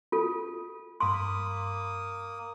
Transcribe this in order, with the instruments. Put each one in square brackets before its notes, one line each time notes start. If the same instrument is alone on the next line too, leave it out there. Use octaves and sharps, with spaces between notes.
[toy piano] F4 A4
[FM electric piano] G2 B5 D6 [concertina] A#3 D#6 [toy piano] C6